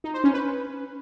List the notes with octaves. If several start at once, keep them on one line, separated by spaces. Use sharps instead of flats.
D#4
C5
C#4
B4